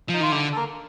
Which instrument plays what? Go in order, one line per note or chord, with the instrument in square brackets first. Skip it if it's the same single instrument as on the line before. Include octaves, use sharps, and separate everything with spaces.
[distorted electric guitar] F3 [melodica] D#4
[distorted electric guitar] D#3 [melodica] F4
[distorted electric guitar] D3 [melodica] G3 G4
[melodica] A4
A#3 A#4